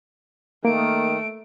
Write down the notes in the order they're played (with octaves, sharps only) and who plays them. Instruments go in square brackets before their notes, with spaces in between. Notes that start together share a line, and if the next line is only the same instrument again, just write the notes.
[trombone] D#3 [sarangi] A3 [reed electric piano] A#3 [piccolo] D7